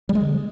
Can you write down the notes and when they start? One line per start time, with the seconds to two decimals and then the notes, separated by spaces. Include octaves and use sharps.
0.09 G3
0.15 G#3
0.21 D3